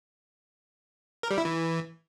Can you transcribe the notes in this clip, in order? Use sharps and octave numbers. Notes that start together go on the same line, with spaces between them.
A#4
G3
E4
E3